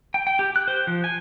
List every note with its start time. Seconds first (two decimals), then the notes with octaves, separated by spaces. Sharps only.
0.14 G5
0.27 G5
0.39 G4
0.56 F#6
0.68 C5
0.87 F3
1.04 G#5